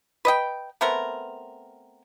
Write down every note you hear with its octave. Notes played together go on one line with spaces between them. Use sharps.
B4 D#5 G5
A3 B3 C4 A#4